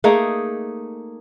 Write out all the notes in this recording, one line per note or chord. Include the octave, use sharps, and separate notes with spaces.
A3 A#3 D#4 G#4